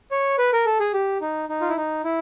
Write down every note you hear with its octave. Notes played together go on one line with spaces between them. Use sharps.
C#5
B4
A#4
A4
G#4
G4
D#4
D#4
F4
E4
D#4
E4